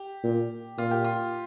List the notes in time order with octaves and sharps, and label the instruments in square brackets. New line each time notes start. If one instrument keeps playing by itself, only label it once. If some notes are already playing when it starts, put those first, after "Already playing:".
Already playing: [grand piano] G4
[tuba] A#2
[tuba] A#2 [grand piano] F4
[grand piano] G4
F4